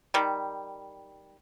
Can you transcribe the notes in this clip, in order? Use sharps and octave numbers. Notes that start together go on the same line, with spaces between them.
D#3 G3